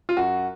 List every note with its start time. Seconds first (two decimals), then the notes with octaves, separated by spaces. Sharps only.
0.09 F4
0.17 F#2 F#4